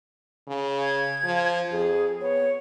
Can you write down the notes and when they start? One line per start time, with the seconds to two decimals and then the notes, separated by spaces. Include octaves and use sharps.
0.48 C#3
0.81 G#6
1.24 F3
1.71 F2 G#4
2.21 B3 C#5